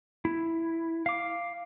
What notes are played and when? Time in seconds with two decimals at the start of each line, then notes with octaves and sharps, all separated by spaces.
0.25 E4
1.06 F5 D6